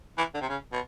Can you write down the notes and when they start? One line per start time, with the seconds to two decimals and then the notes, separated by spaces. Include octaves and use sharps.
0.18 E3
0.34 D3
0.41 C3
0.49 C#3
0.73 B2